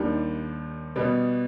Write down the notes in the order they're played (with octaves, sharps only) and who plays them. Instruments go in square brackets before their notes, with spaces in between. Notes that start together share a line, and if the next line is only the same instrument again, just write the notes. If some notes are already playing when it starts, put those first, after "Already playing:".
Already playing: [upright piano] D#2 D#3 G3 D4
B2 G3 B3